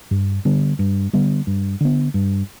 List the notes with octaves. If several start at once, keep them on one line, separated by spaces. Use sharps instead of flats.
G2
D3 G3 B3
G2
D3 G3 B3
G2
D3 B3
G2